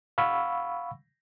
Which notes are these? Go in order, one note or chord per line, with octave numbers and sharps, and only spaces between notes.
F5 F#5 B5 C#6 E6